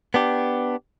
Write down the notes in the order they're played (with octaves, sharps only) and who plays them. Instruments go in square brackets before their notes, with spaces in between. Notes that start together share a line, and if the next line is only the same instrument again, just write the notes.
[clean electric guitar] B3 D4 G4